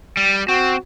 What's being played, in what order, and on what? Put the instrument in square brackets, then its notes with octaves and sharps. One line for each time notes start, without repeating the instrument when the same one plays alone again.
[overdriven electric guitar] G3
[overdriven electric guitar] C4 [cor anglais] F#4